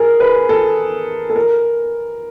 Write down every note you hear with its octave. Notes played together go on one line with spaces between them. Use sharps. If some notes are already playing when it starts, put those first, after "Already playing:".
Already playing: G#4 A#4
B4
A4
A4
A#4